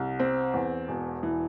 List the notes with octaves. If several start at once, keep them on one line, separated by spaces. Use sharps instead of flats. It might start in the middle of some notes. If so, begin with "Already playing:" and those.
Already playing: C2
C4
E2
E1
E3